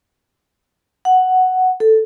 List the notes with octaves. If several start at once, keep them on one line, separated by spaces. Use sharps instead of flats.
F#5
A4